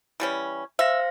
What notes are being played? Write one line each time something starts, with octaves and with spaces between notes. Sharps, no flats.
E3 G3 C#4
C5 E5 F5 A#6